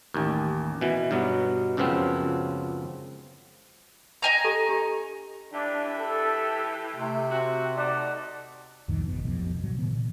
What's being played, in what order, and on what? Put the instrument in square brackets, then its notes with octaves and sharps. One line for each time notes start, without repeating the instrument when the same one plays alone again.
[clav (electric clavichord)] A1 D#2
B2 E3
G2 B2 F#3 B3
C#2 F#2 C#3 F3 B3 C4
[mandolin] D#5 G#5 A#5 [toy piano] G5
[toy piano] G4 A4
D4 G4
[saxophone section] E3 E4 G4 [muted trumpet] D4
[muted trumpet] A4
[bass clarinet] C3 [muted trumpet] A3
[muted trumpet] C4 [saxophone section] F#4
[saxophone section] A3 D#4 F#4 [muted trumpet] D5
[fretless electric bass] C2 F2 A#2 D#3
G#1 B2
D1 B1 F2 B2
G#2 C3 F#3
A#2 D3 E3 B3